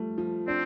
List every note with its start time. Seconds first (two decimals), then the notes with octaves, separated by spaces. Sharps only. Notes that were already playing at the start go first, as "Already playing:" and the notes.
Already playing: F3 G3 A3
0.18 F3
0.47 C4 D4